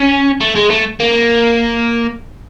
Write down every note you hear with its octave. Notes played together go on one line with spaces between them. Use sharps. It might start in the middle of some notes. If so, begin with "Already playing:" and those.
Already playing: C#4
A3
G#3
A3
A#3